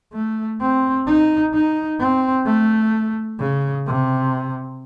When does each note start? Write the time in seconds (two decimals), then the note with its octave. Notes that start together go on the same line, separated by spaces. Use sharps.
0.13 A3
0.60 C4
1.06 D#4
1.53 D#4
1.99 C4
2.46 A3
3.39 C#3
3.86 C3